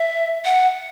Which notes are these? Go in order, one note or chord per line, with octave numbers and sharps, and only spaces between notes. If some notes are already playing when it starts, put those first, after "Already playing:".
Already playing: E5
F#5